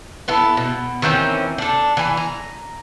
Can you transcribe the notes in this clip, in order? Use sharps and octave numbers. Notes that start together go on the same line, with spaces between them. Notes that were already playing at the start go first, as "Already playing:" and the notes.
B3 E4 A4
B2
D#3 E3 C4 C#4
D4 A4
E3 G#5
A#5